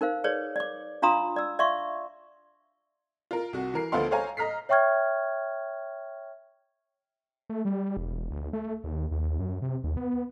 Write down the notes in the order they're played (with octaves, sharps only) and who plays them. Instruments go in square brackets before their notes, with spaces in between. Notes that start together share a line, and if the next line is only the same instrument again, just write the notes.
[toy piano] D#4 A#4 C5 F5
G#4 B4 C#5 D5
D5 D6
D4 F4 F5 A#5 C6 D#6
D5 E6
D5 E5 F5 C6 C#6
[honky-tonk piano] F4 A#4
C2 F#4
E3 A#4 C7
D2 F3 A3 B3 F5 C6
A4 C5 C#5 F5 G#5 A#5
D#5 A#5 F6 B6 C7
[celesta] C#5 E5 G5 C#6 F6 G#6
[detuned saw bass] A3
G3
E1
D2
A3
D#2
D#2
F#2
C3
D#2
B3